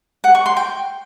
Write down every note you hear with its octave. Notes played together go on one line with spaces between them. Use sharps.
F#5
C#6
C6
G5